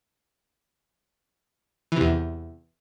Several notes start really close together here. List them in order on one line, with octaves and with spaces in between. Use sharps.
E3 C3 E2